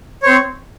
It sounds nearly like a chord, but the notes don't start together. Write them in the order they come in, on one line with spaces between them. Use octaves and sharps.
C#5 C5 C4